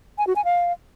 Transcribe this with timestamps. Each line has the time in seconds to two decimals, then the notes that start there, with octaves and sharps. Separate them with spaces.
0.18 G#5
0.27 F#4
0.36 G#5
0.45 F5